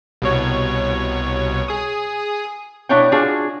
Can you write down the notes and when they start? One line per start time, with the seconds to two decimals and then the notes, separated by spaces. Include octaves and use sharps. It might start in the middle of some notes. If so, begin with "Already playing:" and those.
0.22 C2 B2 C#5
1.68 G#4 D#6
2.89 B2 D4 E4 C#5 F#5 G5
3.12 D4 F4 F#4 G#4